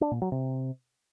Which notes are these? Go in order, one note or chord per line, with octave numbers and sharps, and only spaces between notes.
D4
A#2
F#3
C3